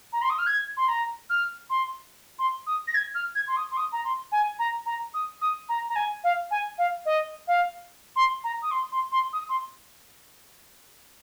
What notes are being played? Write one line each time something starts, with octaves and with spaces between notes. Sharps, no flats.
A#5
C6
D#6
F6
G#6
C6
A#5
F6
C6
C6
D#6
A#6
G#6
F6
G#6
C6
D#6
C6
D#6
A#5
C6
G#5
A#5
A#5
D#6
D#6
A#5
A#5
G#5
F5
G#5
F5
D#5
F5
C6
A#5
D#6
C6
C6
C6
D#6
C6